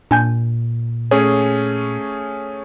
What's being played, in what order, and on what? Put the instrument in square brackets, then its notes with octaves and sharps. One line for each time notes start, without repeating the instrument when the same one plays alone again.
[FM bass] A#2 [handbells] D4 G#5 G6
[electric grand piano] A3 C#4 G#4 [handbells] C#5